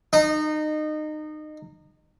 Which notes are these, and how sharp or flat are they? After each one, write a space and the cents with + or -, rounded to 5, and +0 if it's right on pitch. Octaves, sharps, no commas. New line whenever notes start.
D#4 -25